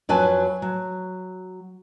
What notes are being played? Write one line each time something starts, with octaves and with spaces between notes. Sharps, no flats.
F2 F#3 B4 G#5 A5
F#3